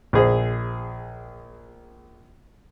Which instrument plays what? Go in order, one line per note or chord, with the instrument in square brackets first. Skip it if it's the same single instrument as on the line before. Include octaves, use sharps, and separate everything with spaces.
[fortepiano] A#1 G#4 C5